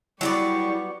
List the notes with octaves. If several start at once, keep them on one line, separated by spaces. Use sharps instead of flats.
F#3 G3 B3 E4 G4 D5 C#6